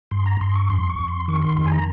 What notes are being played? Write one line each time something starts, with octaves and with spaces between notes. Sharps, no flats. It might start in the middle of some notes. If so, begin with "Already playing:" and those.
G2 C6
A#5
G2 C6
C#6
F2 C6
C#6
F2
C6
D#3 C#6
C6
F2 C6
G#5
A#5